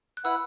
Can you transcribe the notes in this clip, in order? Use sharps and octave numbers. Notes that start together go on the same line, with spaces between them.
F#6
E4 B4 F#5 E6